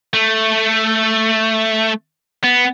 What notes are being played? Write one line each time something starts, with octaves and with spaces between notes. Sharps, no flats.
A3
B3